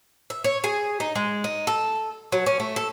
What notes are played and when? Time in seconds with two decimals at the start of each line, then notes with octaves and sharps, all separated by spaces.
0.30 E5
0.44 C#5
0.64 G#4
1.00 D#4
1.15 G#3
1.44 D#4
1.67 A4
2.32 F#3
2.46 C#4
2.60 A3
2.76 A4